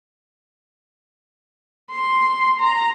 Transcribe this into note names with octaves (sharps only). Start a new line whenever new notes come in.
C6
A#5